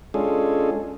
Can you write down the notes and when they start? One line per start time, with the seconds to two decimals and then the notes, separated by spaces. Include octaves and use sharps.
0.14 G#3 C#4 D4 F4 G#4 A4